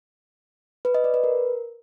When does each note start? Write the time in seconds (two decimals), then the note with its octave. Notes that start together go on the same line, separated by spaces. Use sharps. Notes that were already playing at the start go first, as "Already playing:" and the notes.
0.85 B4
0.95 D#5
1.04 D5
1.14 B4
1.24 A#4